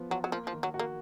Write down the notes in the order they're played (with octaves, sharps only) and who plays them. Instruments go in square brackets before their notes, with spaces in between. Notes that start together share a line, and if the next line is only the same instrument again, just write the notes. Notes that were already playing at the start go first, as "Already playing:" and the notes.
Already playing: [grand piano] F3 B3
[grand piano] F3 [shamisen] F#3
[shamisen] F#3
[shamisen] F3 [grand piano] A#3
[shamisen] F3
[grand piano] D#3
[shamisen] F#3
[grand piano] F#4
[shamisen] A#3